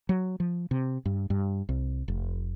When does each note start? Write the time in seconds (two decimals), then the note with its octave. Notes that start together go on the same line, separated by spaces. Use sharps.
0.09 F#3
0.40 F3
0.71 C3
1.06 G2
1.30 G2
1.69 C2
2.08 F1